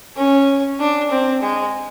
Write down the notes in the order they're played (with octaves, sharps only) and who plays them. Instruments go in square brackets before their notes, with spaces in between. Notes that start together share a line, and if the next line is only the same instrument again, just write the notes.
[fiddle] C#4
D4
C4
G#3